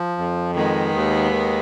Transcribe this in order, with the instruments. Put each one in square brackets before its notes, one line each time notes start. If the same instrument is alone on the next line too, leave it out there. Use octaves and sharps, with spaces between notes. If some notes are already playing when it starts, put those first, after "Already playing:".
Already playing: [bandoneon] F3
F2
[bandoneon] D#3 [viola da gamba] G#3 B3
[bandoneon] D#2
D#3